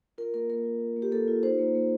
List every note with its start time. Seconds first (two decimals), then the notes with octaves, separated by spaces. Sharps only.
0.18 F4 A#4
0.34 A#3 A#4
0.49 A#3 A#4
0.65 F4
0.81 F4
0.96 A#3
1.02 G4
1.12 A#3 A4
1.28 F4
1.43 D#4 C5
1.59 A#3
1.75 A#3